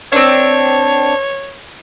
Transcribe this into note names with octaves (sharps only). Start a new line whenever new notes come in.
C4 D4 C#5